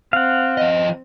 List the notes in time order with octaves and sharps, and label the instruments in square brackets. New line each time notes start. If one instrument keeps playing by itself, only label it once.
[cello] C4 [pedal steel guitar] F5 F#5
[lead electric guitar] F3 D#5